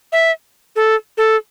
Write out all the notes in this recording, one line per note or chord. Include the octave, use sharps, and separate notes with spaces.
E5
A4
A4